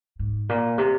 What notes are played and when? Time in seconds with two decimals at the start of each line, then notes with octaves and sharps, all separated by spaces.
0.19 G#2
0.49 A#2
0.78 C3